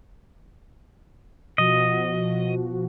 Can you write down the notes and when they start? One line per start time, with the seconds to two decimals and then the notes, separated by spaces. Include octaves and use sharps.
1.58 B2 F3 F#4 D#5